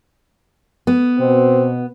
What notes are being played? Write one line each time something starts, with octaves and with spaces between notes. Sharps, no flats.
B3
B2 C4